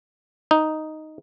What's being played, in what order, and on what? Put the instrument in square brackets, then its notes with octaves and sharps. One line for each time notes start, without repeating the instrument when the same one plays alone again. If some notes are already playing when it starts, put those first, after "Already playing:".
[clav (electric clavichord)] D#4